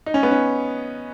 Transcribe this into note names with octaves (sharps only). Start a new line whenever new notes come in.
D#4
C#4
B3
C#4